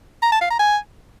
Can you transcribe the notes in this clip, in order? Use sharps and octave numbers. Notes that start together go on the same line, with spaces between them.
A#5
A5
F5
A#5
G#5